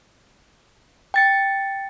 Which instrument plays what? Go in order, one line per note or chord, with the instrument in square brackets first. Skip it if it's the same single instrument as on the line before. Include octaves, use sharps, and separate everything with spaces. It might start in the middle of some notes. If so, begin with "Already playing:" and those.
[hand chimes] G5 A6 C#7